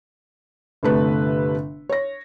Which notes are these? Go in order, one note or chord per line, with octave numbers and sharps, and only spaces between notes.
G1 C3 A3 B4
C#5 A#6